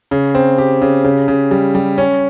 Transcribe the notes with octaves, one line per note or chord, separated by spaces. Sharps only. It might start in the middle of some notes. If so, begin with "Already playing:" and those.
C#3
C4
G4
C#3
C#3
C#3
G3
G3
C#4